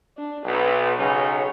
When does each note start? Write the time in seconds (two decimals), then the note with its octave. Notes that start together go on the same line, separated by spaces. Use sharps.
0.17 D4
0.46 B1 B4
0.98 B1 C#3 D#4 C#5